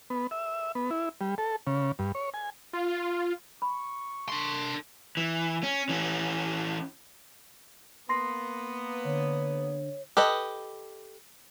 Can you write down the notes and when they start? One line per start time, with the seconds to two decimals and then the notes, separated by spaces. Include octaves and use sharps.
0.10 B3
0.31 E5
0.75 B3
0.91 E4
1.21 G3
1.38 A4
1.67 C#3
1.99 G2
2.15 C#5
2.34 G#5
2.73 F4
3.62 B5 C#6
4.29 D4 C6
5.17 E3
5.63 C#4
5.89 E3 C#4
8.09 A#3 B3 C6 A#6 C7
9.05 D3 C#5
10.17 G4 A4 B4 D#5